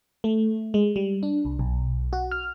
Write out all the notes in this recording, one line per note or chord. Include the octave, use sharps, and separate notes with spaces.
A3
G#3
G3
D4
C2
B1
F#4
F6